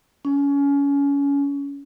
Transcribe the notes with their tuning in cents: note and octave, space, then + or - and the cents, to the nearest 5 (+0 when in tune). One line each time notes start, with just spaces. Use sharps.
C#4 +25